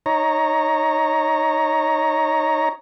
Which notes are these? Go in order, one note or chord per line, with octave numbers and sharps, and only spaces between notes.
D#4 C#5 A#5